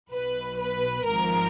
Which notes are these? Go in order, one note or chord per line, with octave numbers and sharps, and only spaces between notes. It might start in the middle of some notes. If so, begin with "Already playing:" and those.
B1 B2 B4
B4
G#1 G#2 F3 A#4